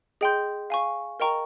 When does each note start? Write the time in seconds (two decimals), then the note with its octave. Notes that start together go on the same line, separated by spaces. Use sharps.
0.21 G#4 D#5 G5 C6 G6
0.70 F5 G#5 C#6
1.20 A#4 D#5 G5 A#5 C#6